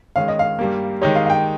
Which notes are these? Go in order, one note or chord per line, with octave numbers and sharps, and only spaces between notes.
D#3 G#3 C#4 F5
D#5
F5
G2 G3 A#3
D#3 G#3 D#4 G4 C#5
F5
F5
G5